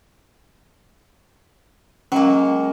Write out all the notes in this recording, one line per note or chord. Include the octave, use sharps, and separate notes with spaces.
F#3 G#3 A#3 C#4